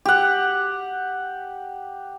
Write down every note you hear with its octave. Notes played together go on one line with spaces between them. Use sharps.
G4 F#5